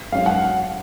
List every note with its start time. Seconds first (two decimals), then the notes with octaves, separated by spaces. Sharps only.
0.12 G#2 F#3 C#4 F5
0.26 F#5